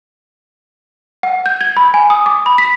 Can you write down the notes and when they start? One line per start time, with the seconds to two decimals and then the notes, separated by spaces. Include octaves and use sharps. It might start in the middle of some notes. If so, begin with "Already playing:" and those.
1.23 F#5
1.46 G6
1.61 G#6
1.77 B5
1.94 G#5
2.10 D#6
2.26 D6
2.46 B5
2.58 B6